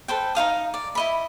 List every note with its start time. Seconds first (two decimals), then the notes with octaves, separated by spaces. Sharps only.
0.08 A4 B4 C5 G5
0.35 D#4 F4 F5 D#6
0.74 D5
0.95 E4 D#5 B5